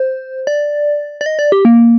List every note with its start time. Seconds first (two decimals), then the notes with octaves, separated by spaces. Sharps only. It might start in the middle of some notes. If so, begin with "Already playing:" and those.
Already playing: C5
0.47 D5
1.21 D5
1.26 D#5
1.39 D5
1.52 G4
1.65 A#3